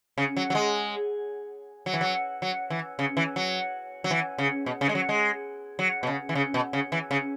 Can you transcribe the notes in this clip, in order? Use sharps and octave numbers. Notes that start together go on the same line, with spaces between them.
C#3
F#3
F#3
G#3
F#3
E3
F#3
F#3
E3
C#3
E3
F#3
F#3
E3
C#3
B2
C#3
G#3
F#3
G#3
F#3
B2
C#3
E3
C#3
B2
C#3
E3
C#3